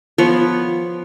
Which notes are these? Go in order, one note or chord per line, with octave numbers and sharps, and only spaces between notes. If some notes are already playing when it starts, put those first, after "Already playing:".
F3 B3 C#5